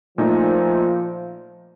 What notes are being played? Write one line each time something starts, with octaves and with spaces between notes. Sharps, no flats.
A#2 F3 A3 D#4